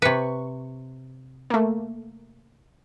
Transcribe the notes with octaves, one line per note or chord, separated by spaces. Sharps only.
C3 B4 C#6
A3 A#3